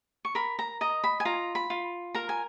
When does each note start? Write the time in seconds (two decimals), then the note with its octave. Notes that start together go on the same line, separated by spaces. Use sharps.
0.25 C#6
0.35 A#4 B5
0.59 A#5
0.81 D#5 A#5
1.04 B5
1.20 G#5
1.25 F4 A#5
1.55 B5
1.70 F4
2.14 A#4 A#5
2.29 G#5